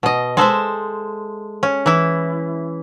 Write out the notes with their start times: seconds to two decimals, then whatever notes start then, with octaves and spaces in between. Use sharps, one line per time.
0.03 B2 D#5
0.37 G#3 A4 C5 E5
1.63 C#4
1.86 E3 E4